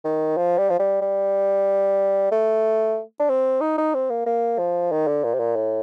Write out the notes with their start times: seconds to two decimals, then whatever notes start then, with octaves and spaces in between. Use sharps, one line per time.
0.05 D#3
0.37 F3
0.58 G3
0.70 F3
0.80 G3
1.02 G3
2.32 A3
3.20 D4
3.30 C4
3.61 D#4
3.78 D#4
3.95 C4
4.10 A#3
4.27 A#3
4.59 F3
4.92 D#3
5.08 D3
5.24 A#2
5.34 C3
5.40 A#2
5.56 A2